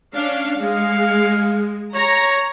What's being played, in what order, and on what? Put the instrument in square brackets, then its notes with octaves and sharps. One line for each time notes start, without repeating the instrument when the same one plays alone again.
[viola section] C#4 D4 F5
[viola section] G#3 [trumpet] F5
[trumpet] C#5 [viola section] A#5